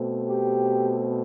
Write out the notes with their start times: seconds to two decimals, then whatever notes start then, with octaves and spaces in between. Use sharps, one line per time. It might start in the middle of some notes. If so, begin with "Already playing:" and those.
Already playing: B2 A3 C4
0.28 G4